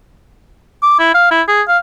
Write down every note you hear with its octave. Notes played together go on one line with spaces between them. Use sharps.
D6
E4
F5
E4
G#4
F5